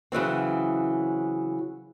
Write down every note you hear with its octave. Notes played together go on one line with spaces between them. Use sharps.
C#3 E3 F#3 C4